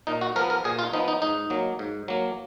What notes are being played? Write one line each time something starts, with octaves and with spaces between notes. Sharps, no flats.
A#2 D#4
F#4
F3 B3 A#4
A#4
A#2 G#4
F4
F3 B3 D#4
D#4
G#2 D#4
F#3 A#3
G#2
F#3 A#3